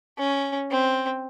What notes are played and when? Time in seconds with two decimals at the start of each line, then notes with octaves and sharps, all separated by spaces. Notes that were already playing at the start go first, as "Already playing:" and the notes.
0.18 C#4
0.71 C4